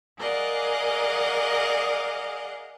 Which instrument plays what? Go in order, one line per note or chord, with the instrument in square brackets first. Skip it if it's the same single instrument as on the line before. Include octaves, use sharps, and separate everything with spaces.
[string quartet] G#4 A#4 D5 D#5 F5 F#5